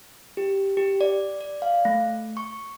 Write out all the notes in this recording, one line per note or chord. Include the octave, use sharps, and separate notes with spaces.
G4
G4
D5
D5
F5
A3
C#6